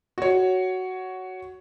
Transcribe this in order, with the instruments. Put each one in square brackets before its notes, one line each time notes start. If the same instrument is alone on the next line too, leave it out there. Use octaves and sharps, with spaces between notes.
[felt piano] F#4 C#5